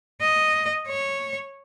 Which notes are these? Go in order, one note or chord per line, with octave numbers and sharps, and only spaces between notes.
D#5
C#5